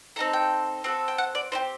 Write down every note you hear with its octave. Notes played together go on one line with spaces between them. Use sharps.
C4 D#4 A4 A#5
G5
C4 F#4 A4
G5
F#5
D5
C4 D#4 G4 C5